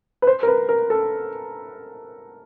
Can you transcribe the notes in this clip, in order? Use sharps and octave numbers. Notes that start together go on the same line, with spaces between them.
B4
C5
A#4
B4
A#4
A4